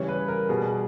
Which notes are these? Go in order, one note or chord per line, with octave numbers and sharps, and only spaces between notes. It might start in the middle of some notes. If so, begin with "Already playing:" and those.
Already playing: C#3 E3 G3 C#5
B4
A#4
B2 G3 G#4